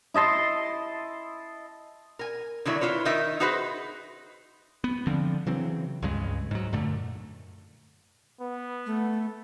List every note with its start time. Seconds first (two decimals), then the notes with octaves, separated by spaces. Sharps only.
0.14 E4 D#5 A5 C6
2.19 A#4 G#5
2.65 D3 D#3 F#3 E4
2.81 E4 F4 B4 C#5
3.05 D#3 D#4 A#4 D#5 E5
3.40 D#4 F#4 G#4 B4 C5
4.84 B3
5.07 D3 F3 C4 D4
5.46 C#3 E3 F#3 C4
6.02 C#2 G2 C#3 G#3
6.51 G#2 F#3
6.73 F#2 A#2 D3 A3
8.41 B3
8.86 A3